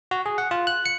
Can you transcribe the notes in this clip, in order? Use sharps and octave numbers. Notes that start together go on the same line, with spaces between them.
F#4
G#4
F#5
F4
F#6
C#7